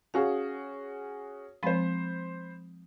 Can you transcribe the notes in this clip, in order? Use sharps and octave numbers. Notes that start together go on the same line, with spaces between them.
C#4 F#4 G#4 F5
F3 G#3 C4 C5 B5